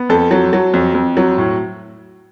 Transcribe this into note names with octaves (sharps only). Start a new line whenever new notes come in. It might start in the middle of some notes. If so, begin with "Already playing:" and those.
Already playing: B3
F2 A4
F#3
F#3
F2
F2
F#3
A2